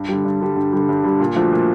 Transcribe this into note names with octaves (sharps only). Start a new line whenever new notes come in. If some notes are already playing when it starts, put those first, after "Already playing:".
Already playing: G2
D3 G3
G2
D3 G3
G2
D3 G3
G2
D3 G3
A#2
F3 A3 D4 F#4
A#2